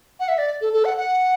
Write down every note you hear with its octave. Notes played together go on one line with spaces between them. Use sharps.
F#5
E5
D5
A4
A4
F#5
F#5